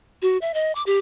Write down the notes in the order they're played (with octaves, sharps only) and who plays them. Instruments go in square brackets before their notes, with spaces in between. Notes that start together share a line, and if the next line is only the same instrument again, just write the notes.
[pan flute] F#4
E5
D#5
D6
G4